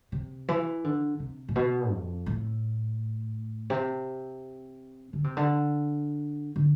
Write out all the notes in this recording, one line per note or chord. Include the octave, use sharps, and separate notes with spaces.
C3
E3
D3
C3
A2
B2
F2
A2
C3
D3
C3
D3
D3